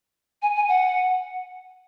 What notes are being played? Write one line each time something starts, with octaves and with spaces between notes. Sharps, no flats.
G#5
G#5
F#5